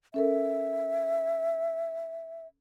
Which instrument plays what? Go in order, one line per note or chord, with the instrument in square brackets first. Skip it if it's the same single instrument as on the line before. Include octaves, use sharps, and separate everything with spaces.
[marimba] C#4 A4 A#4 [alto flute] E5